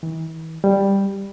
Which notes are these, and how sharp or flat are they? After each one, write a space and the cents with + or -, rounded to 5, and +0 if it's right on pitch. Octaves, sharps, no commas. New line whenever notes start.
E3 -35
G3 +5